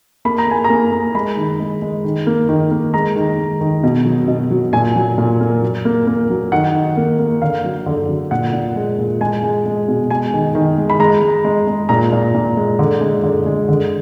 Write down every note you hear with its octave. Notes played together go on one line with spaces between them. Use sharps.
A#3 B5
A#5
A#3 G#5
A#5
A#3
A#3
G#3 B5
D#3
G#3
G#3
D#3
A#3
D#3
A#3
G#3 A#5
D#3
G#3
D#3
B2
F#3
B2
F#3
A#2 G#5
F#3
A#2
A#3
F#3
A#3
A#3
F#3
D#3 F#5
D#3
A#3
A#3
D3 F5
F#3
D3
F#3
A#2 F#5
A#2
G#3
A#2
G#3 G#5
G#3
G#3
B2
G#3 G#5
D#3
D#3
G#3
B5
G#3 A#5
G#3
G#3
G#3
A#2 A#5
A#2
A#2
G#3
D3
G#3
D3
G#3
D3